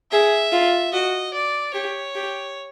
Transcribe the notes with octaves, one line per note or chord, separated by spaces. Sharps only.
G#4 E5
F4
F#4 D#5
D5
G4 C#5
G4